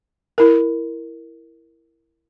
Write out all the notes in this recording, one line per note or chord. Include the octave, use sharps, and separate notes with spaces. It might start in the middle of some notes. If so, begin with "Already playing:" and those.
E4 A#4